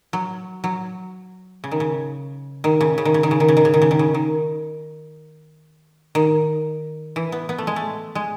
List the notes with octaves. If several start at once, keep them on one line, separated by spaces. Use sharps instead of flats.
F#3
F#3
C#3
D#3
C#3
D#3
C#3
C#3
D#3
C#3
D#3
C#3
D#3
C#3
D#3
C#3
D#3
C#3
D#3
C#3
D#3
D#3
E3
B3
B3
A3
G#3
A3
G#3